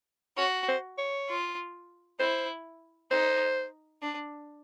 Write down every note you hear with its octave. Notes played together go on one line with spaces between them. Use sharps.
F#4 C#5
C5
C#5
F4
E4 C5
D#4 C5
D4